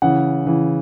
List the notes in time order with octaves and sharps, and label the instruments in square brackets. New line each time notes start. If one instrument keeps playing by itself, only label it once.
[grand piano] C#3 E3 F#5
C#3 E3